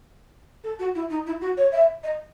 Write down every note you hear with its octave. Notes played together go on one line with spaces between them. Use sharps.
A4
F#4
E4
D#4
E4
F#4
C#5
E5
D#5